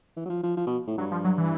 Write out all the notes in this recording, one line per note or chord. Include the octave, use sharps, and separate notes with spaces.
E3
F#3
F3
F3
F3
B2
A2
G2 F#3
F3
F#3
E3